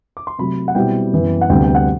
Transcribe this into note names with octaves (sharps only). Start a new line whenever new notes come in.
D6
C6
C3 F#3 A3 B5
F#5
B2 G3 C4 E4 G5
F#2 E3 B3
F#5
D2 C3 G3 B3 G5
G5
F#5